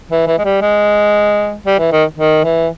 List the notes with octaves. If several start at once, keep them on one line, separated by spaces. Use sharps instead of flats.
E3
E3
G#3
G3
G#3
G3
E3
D#3
D#3
E3